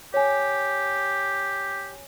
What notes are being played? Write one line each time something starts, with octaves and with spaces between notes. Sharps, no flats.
G4 C#5 G#5